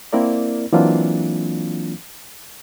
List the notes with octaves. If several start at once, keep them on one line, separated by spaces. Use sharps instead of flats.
A#3 C4 E4 A#4 D5
E3 F#3 A#3 C4 D4 F4